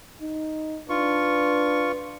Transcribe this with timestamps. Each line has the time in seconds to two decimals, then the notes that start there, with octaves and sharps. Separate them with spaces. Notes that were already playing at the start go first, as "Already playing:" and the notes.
0.21 D#4
0.89 D4 F4 B4 C#6